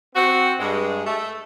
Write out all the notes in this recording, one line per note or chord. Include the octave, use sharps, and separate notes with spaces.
C4 F#4
G2 G#3
A3